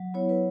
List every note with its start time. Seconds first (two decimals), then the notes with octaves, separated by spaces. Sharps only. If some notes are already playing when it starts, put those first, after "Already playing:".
Already playing: F#3
0.14 B3 E4 C#5
0.29 B4